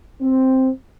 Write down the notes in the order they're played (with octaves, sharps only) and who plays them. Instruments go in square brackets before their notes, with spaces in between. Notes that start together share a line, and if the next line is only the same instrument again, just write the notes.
[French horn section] C4